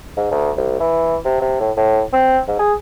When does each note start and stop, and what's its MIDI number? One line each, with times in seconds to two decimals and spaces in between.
0.17 0.30 44
0.31 0.51 38
0.57 0.76 36
0.80 1.16 52
1.25 1.39 48
1.42 1.59 48
1.60 1.71 45
1.77 2.01 45
2.13 2.39 60
2.48 2.59 44
2.59 2.74 68